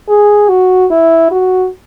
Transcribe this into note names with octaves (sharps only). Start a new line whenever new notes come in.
G#4
F#4
E4
F#4